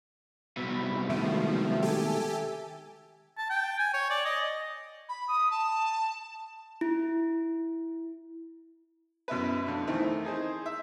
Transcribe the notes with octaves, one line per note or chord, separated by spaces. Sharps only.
C2 B2 E5 B5
D#3 F3 G#3 A3 E5
G4 A4 G#5
A5
G5
G#5
C#5
D5
D#5
B5
D#6
A5
E4
F#2 B2 E4 B4
F2 D4
D#3 E3 A3 C4
D#4 G#4 C5
E5